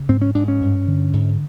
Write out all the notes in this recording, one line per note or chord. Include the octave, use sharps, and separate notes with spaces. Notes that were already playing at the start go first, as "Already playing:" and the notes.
Already playing: C#3
G#2 C4
C#4
G#2 D4
C#4
G2
D3
G#2